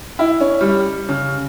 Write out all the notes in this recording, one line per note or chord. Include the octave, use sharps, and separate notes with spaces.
E4
C#4
G3
C#3